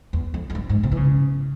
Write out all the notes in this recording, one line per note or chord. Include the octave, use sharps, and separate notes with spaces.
E2
F2
F2
G2
G#2
C3
E3
C#3